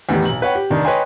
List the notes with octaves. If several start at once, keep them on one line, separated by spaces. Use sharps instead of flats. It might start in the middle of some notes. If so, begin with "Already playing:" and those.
E2 A2 D#3 G4
B1 F#7
B4 C#5 F#5 G5
G4
F1 D#3 D4
B4 C#5 D#5 G5 G#5 C6